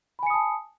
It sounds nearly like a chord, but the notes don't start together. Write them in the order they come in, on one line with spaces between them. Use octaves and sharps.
B5 G#5 C#7 D#6 A5